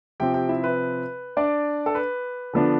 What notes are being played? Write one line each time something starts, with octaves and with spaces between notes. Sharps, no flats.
C3 F3 C4 G4 G5
G4 G5
E4 E5
B4
D4 D5
A4
B4
D3 F3 B3 D4